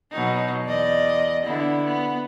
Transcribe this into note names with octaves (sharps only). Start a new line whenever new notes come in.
B2 F#3 D#4
E2 D5 D#5
D3 B3 E4
B3